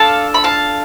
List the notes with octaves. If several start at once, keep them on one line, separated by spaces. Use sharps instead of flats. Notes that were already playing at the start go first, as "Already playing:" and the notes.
Already playing: D4 F4 A4 F5 A5
B5
F5 A5